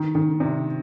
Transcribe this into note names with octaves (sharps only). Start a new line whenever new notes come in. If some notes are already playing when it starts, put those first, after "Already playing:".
Already playing: D#3
D#3
C3